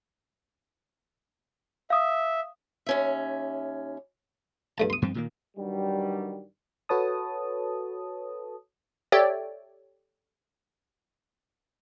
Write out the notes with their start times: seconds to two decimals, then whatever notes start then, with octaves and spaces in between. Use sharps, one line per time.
1.90 E5 F5 D#6
2.86 D#2 C#4 E5
4.78 G2 A3 A5
4.90 C6 D#6
5.02 G2 F3 C4
5.15 A#2 D#3 A#3
5.57 G2 D#3 F#3 G3
6.89 F#4 A4 B4 C#5 A5 D#6
9.12 G4 A4 C#5 D5 E5 G5